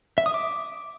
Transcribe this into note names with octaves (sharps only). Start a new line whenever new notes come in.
E5
D#6
D6